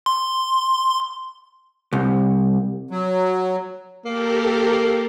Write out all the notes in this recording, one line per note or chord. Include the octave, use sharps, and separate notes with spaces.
C6
C2
F#3
A#3 G4 A4 A#4